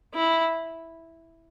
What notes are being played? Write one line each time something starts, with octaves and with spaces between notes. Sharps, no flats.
E4